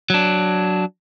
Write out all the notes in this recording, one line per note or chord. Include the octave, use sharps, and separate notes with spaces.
F#3 D4